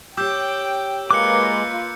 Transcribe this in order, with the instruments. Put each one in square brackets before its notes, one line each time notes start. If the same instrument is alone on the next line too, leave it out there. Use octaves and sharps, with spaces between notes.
[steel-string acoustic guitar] G4 C#5 [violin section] G5 [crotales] D6 E6 G6
[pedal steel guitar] G#3 D6 [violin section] A#3 F4 B4 [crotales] F#6 C#7